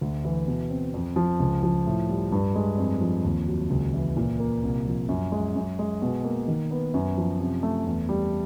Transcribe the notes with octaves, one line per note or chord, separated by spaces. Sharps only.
D2
E3
B2
C4
F2
F3
C#2
F3
A2
G3
G2
G#3
F2
F3
D#2
F#3
C#2
E3
A#2
A#3
C2
F3
F#2
G#3
F#2
G#3
B2
A#3
D#3
B3
F#2
F3
C3
A3
E2
G3